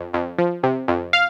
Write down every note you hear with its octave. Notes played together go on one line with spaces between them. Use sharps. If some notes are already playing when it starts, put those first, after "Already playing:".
Already playing: F2
F2
F3
C3
F2
F5